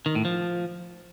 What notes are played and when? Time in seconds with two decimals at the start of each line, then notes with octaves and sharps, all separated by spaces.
0.06 D#3
0.15 A2
0.25 F3